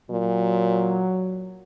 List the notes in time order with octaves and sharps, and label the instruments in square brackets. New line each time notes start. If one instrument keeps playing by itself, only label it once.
[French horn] A#2 [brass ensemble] F#3